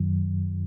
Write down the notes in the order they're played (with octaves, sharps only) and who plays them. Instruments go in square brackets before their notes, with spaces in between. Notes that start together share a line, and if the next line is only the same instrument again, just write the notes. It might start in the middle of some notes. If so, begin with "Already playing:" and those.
Already playing: [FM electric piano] F#2 D#3 F#3